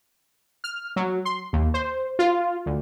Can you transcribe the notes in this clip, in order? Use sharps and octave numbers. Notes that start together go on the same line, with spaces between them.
F6
F#3
C6
D#2
C5
F4
D2